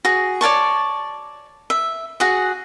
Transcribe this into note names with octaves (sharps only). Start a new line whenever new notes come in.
F#4 G#4
C#5 D5 A5 C#6
E5
F#4 G#4 F#5